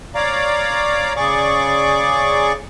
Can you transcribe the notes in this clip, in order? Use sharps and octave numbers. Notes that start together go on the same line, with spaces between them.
C#5 D5 F5 A#5 D6
C#3 G#4 D5 C#6 D6